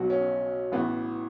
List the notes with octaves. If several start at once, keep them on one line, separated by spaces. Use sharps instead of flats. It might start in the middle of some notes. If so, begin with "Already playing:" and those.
Already playing: B1 B2 F#3 F#4
C#4
A1 A2 E3 B3